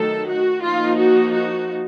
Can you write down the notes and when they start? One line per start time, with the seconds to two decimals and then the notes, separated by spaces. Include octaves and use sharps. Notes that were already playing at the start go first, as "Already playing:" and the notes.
Already playing: D#3 F#3 A3 D#4 A4
0.26 F#4
0.61 F3 A#3 D#4 F4
0.97 F#4
1.32 F#4